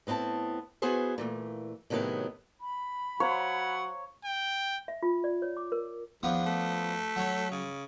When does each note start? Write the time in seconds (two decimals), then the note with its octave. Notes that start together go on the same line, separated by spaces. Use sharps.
0.07 A2 B3 C4 E4 A5
0.82 B3 E4 F#4 G#4 B4 C5
1.18 A#2 E3 A3
1.90 A2 C3 D#3 F#3 B3 E4
2.61 B5
3.20 F#3 C5 C#5 F5 F#5 A#5
4.25 G5
4.88 E5
5.02 F4
5.24 D5
5.42 C#5
5.57 D6
5.72 A#4
6.23 E2 F3 B3 D4
6.46 A3
7.16 F#3 C#5
7.51 C#3